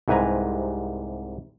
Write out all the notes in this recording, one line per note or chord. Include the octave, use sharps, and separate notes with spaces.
C2 G#2 C3 B4 G#5 A#5